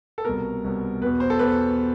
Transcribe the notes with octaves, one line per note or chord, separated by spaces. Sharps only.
A4
C2 B2 A#4
C2 B2
E2 B2 B4
C5
A4
E2 B2 B4